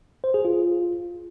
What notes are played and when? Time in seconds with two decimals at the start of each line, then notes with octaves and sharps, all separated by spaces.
0.24 C5
0.34 G#4
0.45 F4